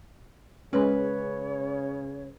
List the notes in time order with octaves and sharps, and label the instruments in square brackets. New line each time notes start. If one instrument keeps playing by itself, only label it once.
[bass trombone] C#3 [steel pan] G#3 C#4 [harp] B4 [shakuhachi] C#5